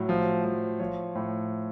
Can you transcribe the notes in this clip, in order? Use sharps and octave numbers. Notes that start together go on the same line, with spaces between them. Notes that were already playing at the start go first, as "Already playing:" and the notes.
Already playing: A2 F#3
F3
F3
F3 C#5
A2